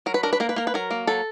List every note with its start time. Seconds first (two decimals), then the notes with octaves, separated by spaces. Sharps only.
0.06 F#3 A#4
0.14 B4
0.23 D4 A#4
0.33 B4
0.40 A#3 A#4
0.49 B4
0.56 A#3 A#4
0.67 B4
0.74 F#3 A#4
0.91 A#3
1.07 F#3 A4